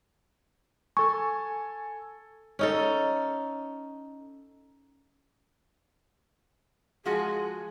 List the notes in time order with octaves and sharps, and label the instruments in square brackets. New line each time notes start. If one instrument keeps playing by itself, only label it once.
[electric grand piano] A4 G#5 [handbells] C#6
[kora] C#4 D#4 A4
[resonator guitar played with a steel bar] F3 G#3 F#4 [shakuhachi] G#4